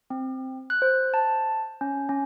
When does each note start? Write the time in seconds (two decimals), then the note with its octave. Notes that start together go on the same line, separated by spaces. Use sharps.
0.10 C4
0.70 F#6
0.82 C5
1.14 A5
1.81 C#4
2.09 C#4